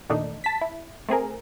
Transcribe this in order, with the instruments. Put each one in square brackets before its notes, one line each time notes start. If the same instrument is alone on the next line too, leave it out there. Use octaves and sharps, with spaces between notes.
[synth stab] E2 A#2 D#3 A3 D4 D#4
A5 B6
E4
A3 C4 G#4 A#4